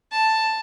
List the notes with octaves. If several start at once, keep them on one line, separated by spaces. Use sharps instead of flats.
A5